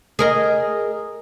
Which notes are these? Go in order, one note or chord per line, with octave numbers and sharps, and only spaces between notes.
G#4 A#4 D#5